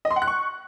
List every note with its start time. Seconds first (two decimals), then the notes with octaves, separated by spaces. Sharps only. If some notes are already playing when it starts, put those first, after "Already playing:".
0.05 D#5
0.11 C6
0.16 F#5
0.22 F#6
0.27 C#6